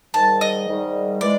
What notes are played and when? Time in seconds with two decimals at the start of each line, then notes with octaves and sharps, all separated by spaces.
0.14 G#2 D#3 G3 A5
0.41 D#5
0.67 G#2 D#3 G3
1.21 E3 G#3 D5